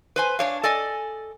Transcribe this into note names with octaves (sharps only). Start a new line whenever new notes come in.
B4 C5 G#5
D4 C#5 F5
A4 D5 D#5 G#5